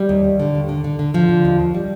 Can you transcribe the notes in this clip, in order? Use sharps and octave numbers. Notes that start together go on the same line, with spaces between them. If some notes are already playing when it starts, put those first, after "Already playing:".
Already playing: G3
D#2
D#2
D3
D#2
D3
D3
D3
D3 F3
D3
D#2
D#2
G3